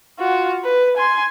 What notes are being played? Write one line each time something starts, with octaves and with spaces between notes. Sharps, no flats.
F4 F#4
B4
G#5 C6